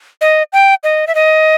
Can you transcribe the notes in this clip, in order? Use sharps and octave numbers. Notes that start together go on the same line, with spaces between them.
D#5
G5
D#5
E5
D#5